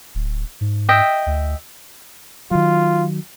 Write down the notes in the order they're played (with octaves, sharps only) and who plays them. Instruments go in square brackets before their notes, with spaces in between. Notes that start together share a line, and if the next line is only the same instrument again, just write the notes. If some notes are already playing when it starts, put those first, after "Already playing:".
[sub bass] D1
G#2
[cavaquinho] D#5 E5 G5
[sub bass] D2
[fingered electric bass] D#3 F#3 [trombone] F4